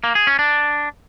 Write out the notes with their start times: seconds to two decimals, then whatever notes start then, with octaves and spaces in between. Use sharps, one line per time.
0.04 A#3
0.15 G#4
0.27 C#4
0.39 D4